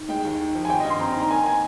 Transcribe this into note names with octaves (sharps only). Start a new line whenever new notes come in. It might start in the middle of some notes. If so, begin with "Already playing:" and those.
Already playing: D#3
G#3 G5
D#2
D#4
F3
G#5
G#1 G5
D#5
G2
C6
C4 A#5
D#3
A#5
A#3 G#5
G#5